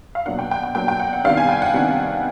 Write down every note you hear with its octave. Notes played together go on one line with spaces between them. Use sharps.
F5
B2 F#3 A#3 D4 F#5
G5
G5
G5
B2 F#3 A#3 D4 G5
G5
F#5
F#5
C3 D#3 G3 B3 D4 F5
G#5
G5
F#5
C3 D#3 G3 B3 D4